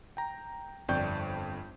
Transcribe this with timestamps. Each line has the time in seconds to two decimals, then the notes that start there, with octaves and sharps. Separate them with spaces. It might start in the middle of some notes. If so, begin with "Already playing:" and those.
0.17 G5 A#5
0.88 G1 F2 D5 G5 C#6 G6